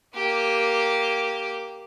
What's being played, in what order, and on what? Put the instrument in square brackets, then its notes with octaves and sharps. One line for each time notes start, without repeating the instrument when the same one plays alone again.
[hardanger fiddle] A#3 G4